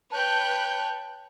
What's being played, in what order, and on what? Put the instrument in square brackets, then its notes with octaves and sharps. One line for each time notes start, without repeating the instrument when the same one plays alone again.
[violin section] B4 F#6 G6 [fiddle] C#5 G5 [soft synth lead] A5